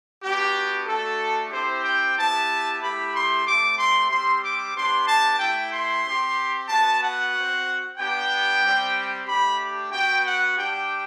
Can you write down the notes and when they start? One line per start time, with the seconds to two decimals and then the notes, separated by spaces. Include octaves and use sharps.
0.22 B3 D4 F#4 G4
0.86 A3 D4 F#4 A4
1.51 C4 E4 G4 C5
1.84 G5
2.16 B3 E4 G4 A5
2.81 A3 E4 G4 B5
3.13 C6
3.46 A3 C4 G4 D6
3.77 C6
4.09 G3 C4 G4 C6
4.42 D6
4.74 B3 D4 G4 C6
5.06 A5
5.39 A3 E4 G4 G5
5.71 C6
6.04 C4 G4
6.68 B3 F#4 A5
7.01 F#5
7.33 C4 F#4
7.97 B3 D4 G4 G5
8.61 G3 C4 G4
9.26 A3 D4 G4 B5
9.91 B3 F#4 G5
10.24 F#5
10.56 G3 D4 G4 G5